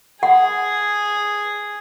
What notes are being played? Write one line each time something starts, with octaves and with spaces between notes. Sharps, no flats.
G#4 F#5